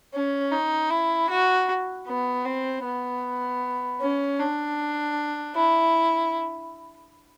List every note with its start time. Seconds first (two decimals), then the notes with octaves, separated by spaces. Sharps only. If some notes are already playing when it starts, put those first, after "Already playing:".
0.13 C#4
0.52 D#4
0.90 E4
1.29 F#4
2.07 B3
2.45 C4
2.84 B3
4.01 C#4
4.40 D4
5.56 E4